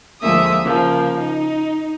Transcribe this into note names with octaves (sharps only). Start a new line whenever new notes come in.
D2 F3 G#3 A#3 E5 D#6
C#3 F3 A#3
D#4